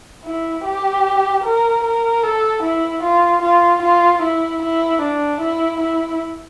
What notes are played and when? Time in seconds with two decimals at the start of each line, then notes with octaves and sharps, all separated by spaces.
0.25 E4
0.65 G4
1.44 A#4
1.84 A#4
2.23 A4
2.63 E4
3.03 F4
3.42 F4
3.82 F4
4.23 E4
4.62 E4
5.01 D4
5.41 E4
5.81 E4